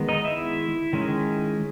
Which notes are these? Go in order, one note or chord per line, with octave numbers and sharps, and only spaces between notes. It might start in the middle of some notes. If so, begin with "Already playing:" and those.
Already playing: D#3 G#3 B3
D#4 D#5
E4 E5
D#3 G#3 C#4